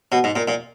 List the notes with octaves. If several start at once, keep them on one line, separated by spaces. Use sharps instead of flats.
B2
G#2
A#2
A#2